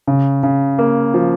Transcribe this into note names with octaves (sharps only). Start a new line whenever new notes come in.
C#3
C#3
A#3
F3